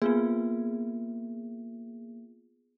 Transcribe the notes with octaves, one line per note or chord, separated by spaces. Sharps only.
A#3 B3 F4 G#4